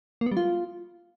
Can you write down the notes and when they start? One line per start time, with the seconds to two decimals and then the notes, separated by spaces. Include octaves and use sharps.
0.21 A#3
0.26 B3
0.32 G3
0.37 F4